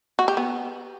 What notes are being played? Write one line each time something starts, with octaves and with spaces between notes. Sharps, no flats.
F#4
G4
B3